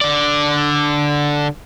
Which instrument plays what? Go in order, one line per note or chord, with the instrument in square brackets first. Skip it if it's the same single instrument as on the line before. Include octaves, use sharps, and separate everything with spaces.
[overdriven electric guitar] D3 D5